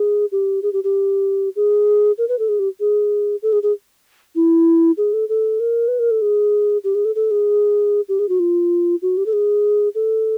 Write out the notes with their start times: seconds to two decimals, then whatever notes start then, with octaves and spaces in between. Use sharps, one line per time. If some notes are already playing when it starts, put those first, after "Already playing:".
Already playing: G#4
0.32 G4
0.62 G#4
0.73 G4
0.84 G4
1.56 G#4
2.18 A#4
2.28 B4
2.39 A4
2.49 G#4
2.59 G4
2.80 G#4
3.42 A4
3.52 G#4
3.63 G#4
4.35 E4
4.97 G#4
5.13 A4
5.29 A4
5.60 A#4
5.88 B4
5.99 A#4
6.11 A4
6.22 G#4
6.84 G4
6.95 G#4
7.05 A4
7.15 A4
7.31 G#4
8.08 G4
8.19 G#4
8.29 F#4
8.39 F4
9.02 F#4
9.17 G4
9.26 A4
9.33 G#4
9.95 A4